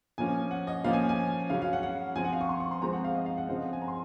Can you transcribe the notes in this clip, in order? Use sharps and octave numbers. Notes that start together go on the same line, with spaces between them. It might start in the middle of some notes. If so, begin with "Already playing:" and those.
A#2 F3 A#3 C#4 G#5
F#5
D#5
A#2 F3 A#3 C#4 F5
G#5
G#5
C#3 F#3 C#4 F5
F5
F#5
F#5
F3 C4 G#5
F#5
F5
C#6
C6
C#6
C6
F3 G#3 C4 A#5
F#5
F5
D#5
F5
F#5
C#3 F3 C4 D#5
F5
F#5
G#5
A#5
C6